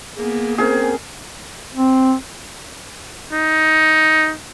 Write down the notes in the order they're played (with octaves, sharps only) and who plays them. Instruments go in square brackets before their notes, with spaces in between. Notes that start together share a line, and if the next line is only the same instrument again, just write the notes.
[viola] A#3 B3 [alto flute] G#4
[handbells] C4 C#4 A#4 [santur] G#4 [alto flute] C5
[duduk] C4
[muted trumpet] D#4